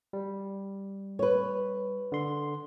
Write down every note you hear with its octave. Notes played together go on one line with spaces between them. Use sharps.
G3
B4 C#5
D3 C6